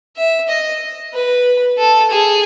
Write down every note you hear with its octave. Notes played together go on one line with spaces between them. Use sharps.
E5
D#5
B4
A4
G#4